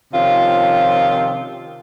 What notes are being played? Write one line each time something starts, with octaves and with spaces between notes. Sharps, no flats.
C3 D#3 F3 C#4 F4